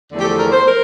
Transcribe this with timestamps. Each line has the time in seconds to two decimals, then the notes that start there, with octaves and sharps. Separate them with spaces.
0.12 E2 D3 F3 A3
0.19 G4
0.24 A4
0.38 A#4
0.52 C5
0.65 A#4